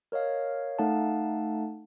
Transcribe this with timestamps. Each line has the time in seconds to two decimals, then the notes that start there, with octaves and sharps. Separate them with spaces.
0.12 A#4 C#5 D#5 F5
0.79 A3 D#4 A4 F5 F#5 A5